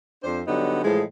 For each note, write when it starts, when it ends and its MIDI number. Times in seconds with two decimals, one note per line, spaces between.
0.24 0.41 41
0.24 0.41 62
0.24 0.41 72
0.47 0.81 50
0.47 0.81 54
0.47 0.81 55
0.47 0.81 59
0.47 0.81 63
0.84 1.02 45
0.84 1.02 52
0.84 1.02 53
0.84 1.02 56